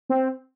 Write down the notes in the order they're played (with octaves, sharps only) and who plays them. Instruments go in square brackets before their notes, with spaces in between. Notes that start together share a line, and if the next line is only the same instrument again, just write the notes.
[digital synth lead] C4